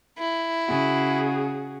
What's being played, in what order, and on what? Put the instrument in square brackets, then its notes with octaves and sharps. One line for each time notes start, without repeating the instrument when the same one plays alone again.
[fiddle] E4
[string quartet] C#3 [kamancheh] F#4 G#4